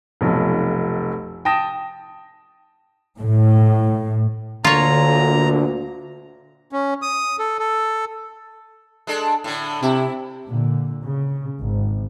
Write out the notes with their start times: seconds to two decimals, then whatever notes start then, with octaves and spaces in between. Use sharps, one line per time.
0.21 F1 B1 F3
1.45 G5 A5 D#6 A#6 E7
3.18 A2
4.65 D2 A#2 D3 F4 C#5 A#5
6.72 C#4
7.02 D#6
7.39 A4
7.59 A4
9.07 G#3 D4 A4
9.44 A2 D3
9.82 C3 E4
10.48 A#2 D3
11.04 C#3
11.62 G#1